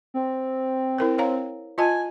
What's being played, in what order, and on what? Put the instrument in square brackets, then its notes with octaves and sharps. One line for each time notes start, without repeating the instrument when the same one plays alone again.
[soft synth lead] C4
[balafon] E4 A#4 C5
C#5 F5 A#5
[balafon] F4 D#5 A5 [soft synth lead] G#5